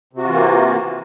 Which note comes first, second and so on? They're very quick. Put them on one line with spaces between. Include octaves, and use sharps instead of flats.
C3 F#4 F4 E3 A#3